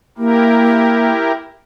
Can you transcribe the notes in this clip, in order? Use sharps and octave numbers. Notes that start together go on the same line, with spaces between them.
A#3 E4 G4 A#4